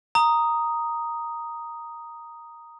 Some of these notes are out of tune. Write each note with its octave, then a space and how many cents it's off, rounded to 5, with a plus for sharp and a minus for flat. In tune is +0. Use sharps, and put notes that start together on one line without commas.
A#5 +0 D#6 +0